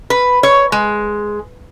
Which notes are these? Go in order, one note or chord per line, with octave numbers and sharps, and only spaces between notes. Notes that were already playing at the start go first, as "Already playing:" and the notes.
B4
C#5
G#3